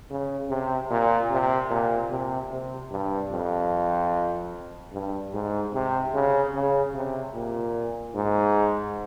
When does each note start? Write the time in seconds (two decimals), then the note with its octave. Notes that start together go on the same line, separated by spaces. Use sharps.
0.10 C#3
0.49 C3
0.90 A#2
1.31 C3
1.70 A#2
2.10 C3
2.51 C3
2.91 G2
3.31 F2
4.92 G2
5.34 G#2
5.73 C3
6.14 C#3
6.54 C#3
6.94 C3
7.34 A#2
8.14 G#2